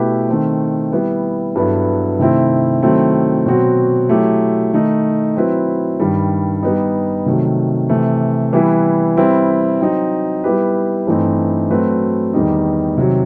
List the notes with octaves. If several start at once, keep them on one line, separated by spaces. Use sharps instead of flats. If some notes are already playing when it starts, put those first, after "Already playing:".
Already playing: B2 A3 E4 G4 B4
D#3 A3 C4
G3 B3 E4
G2 F#3 B3 E4 A4
C3 D#3 A3 C4 E4
D#3 F#3 A3 C4 E4
B2 F#3 C4 F#4
F#3 A3 E4 G4
D#3 A3 D#4
F#3 C4 E4 B4
G2 D#3 G3
G3 B3 D#4
C3 D#3 F#3 A3
C3 E3 A3
E3 G3 B3 E4 B4
G3 C4 E4 B4
F#3 C4 D#4
G3 B3 E4 G4 B4
G2 E3 A3 C4 D#4
F#3 A3 C4 F#4 B4
E2 D#3 G3 D#4
C3 D#3 F#3